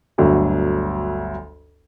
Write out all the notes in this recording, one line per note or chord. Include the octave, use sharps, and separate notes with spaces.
G1 D2 F#3